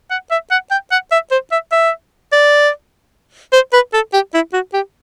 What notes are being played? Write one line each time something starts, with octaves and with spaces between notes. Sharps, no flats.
F#5
E5
F#5
G5
F#5
E5
C5
E5
E5
D5
C5
B4
A4
G4
E4
F#4
G4